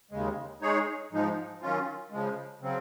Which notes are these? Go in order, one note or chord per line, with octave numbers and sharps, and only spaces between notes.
D#2 C#3 G#3
G#3 D#4 G#4 C#5
G#2 F3 G#3 D#4
D#3 F#3 C#4 F4
C#3 F3 G#3
C#3 F#3 C4